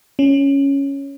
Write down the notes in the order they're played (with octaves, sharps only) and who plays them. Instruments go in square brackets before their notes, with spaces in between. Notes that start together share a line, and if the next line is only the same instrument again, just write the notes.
[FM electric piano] C#4